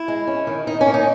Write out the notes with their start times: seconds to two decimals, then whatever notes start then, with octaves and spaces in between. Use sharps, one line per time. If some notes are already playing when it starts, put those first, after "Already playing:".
Already playing: E4
0.08 G#3
0.27 C#4
0.47 D#3
0.67 D#3 D#4
0.81 C#4
0.87 A#3
0.94 D#4